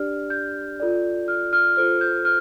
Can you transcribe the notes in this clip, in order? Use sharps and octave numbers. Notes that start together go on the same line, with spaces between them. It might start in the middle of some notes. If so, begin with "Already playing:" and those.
Already playing: D4 G4 D5 F6
G6
F4 A4 D5
F6
F6
F4 A4 C5 F6
G6
F6